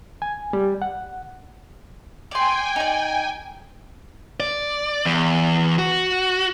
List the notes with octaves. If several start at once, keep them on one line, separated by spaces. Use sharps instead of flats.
G#5
G3
F#5
D5 G5 G#5 C6
D#4 D5
D5
E2
F#4